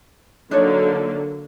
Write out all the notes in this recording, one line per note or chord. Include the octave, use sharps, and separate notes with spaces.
D3 F#3 A#3 D4 D#4 C#5